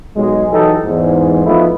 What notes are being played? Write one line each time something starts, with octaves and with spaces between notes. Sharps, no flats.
B1 F#3 G#3
E3 F#3 D#4 G4 A4
E2 G#2
F3 A3 B3 D#4 E4